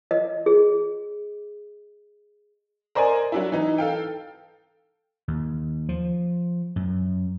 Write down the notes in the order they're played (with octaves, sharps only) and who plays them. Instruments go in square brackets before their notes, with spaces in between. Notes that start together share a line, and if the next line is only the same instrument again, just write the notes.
[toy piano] D#5
G#4
[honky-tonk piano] A#4 C5 D5 D#5 G#5
F#3 D4 E4
E3 D#4
A4 F5 G5
[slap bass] D#2
F3
F#2